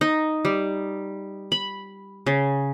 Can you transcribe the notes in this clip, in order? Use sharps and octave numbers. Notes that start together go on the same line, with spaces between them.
D#4
G3
B5
C#3